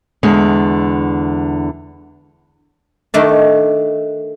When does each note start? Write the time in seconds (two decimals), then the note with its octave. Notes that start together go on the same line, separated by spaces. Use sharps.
0.23 E2 D3 G#3
3.14 D#3 A3 D4